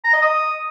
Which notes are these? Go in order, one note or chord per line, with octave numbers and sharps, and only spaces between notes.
A#5
D#5
D#6